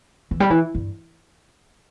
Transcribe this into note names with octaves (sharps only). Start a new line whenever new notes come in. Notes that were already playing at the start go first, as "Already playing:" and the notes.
E3
G3
E3
G2